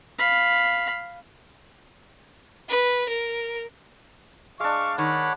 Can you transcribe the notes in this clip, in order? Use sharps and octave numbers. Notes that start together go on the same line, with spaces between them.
F5 B5
B4
A#4
G#3 D4 F5 C#6 D6
D#3 C#5 F#5 B5 D6